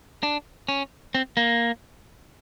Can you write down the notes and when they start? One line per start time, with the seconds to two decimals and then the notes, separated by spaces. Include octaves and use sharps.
0.23 D4
0.68 C#4
1.15 C4
1.37 A#3